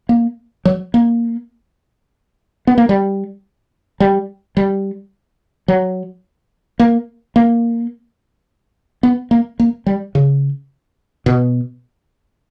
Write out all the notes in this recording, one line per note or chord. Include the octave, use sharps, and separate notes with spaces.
A#3
F#3
A#3
B3
A#3
G3
G3
G3
F#3
A#3
A#3
B3
A#3
A#3
G3
C#3
B2